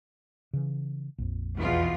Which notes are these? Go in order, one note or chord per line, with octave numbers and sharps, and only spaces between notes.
C#3 E3
A#1 F2
E2 B2 F4